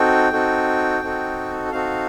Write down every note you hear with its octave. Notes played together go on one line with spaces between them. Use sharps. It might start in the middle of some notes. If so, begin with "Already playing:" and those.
Already playing: C4 D#4 F#4 A4 G5
C4 D#4 F#4 A4
C4 D#4 F#4 A4
C4 D#4 F#4 A4 F5